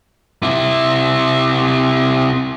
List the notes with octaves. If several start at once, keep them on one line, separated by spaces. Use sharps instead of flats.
C3 E4